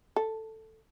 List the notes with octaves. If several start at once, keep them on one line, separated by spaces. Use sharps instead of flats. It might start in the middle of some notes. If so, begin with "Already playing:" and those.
A4